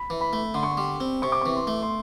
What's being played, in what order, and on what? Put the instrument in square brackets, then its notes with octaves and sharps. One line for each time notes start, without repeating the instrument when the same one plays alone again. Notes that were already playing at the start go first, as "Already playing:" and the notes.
Already playing: [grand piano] B5
[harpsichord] E3
[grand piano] B5
[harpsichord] A3
[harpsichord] D3 [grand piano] C6
[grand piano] C#6
C6
[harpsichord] G3
C4
[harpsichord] C3 [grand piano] C#6
[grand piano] D6
[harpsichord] E3 [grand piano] C#6
[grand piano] C6
[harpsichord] A3
[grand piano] C6